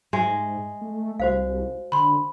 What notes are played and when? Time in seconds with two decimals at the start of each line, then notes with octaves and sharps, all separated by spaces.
0.13 G#2 G#3 E5
0.81 A3
1.20 C2 F#4 C5 F5
1.92 D3 B5 C6